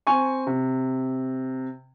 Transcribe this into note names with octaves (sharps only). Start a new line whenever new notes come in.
C4 G#5 C#6
C3